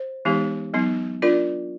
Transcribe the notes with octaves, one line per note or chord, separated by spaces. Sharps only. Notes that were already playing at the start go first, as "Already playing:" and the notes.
Already playing: C5
E3 G#3 B3 D#4 G4
F#3 B3 D#4
D4 F4 A#4 D5